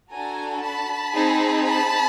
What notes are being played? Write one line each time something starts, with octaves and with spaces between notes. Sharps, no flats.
D4 F#4 A4 G#5 A#5
A5 B5
C4 D#4 G#4
A5 B5